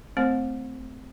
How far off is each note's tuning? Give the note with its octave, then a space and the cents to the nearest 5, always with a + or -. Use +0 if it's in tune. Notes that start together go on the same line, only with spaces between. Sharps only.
A3 +0 C4 -20 C5 +25